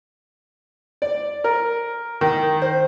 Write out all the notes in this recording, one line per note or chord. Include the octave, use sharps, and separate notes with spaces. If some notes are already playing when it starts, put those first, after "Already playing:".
D5
A#4
D#3
C5